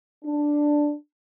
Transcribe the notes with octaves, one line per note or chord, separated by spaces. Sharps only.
D4